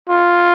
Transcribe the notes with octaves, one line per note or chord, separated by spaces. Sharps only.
F4